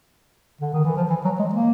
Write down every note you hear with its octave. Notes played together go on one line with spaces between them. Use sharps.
D3
D#3
E3
F3
E3
F#3
G#3
A#3